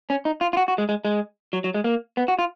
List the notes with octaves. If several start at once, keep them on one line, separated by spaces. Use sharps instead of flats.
C#4
D#4
F4
F4
F#4
F#4
G#3
G#3
G#3
F#3
F#3
G#3
A#3
B3
F#4
F4